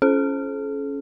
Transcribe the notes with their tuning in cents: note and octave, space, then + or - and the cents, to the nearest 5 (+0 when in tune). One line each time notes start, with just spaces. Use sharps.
C#4 +0 A4 -45